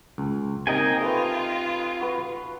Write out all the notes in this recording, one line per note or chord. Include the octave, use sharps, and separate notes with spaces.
C#2
C3 A#3 D#4 D#5 F5 G5 G#5 A#5
A3 F4 B4
F#4 B4